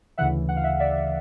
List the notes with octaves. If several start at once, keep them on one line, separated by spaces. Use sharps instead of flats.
D2 C#3 E3 E5 F#5
F#5
F5
E5 F#5
D5 E5